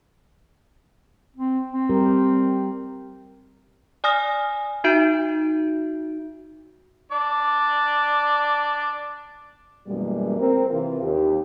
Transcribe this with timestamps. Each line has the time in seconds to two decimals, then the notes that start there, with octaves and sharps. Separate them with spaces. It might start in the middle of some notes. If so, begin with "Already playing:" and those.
1.36 C4
1.72 C4
1.90 G3 G4 A#4
4.04 D5 G#5 D#6 F6 A#6
4.84 D#4 F#4 E5 G6 D7
7.12 D4 D5
9.87 F#2 B2 E3 G3 G#3 A#3
10.39 C4 A#4
10.70 C3 E3 F4
11.03 D#2 G4